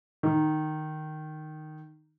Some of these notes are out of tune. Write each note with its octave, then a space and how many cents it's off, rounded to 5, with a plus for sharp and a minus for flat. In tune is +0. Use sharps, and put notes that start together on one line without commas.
D#3 -10